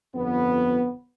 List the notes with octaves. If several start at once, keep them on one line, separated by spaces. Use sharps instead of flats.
G1 F2 B3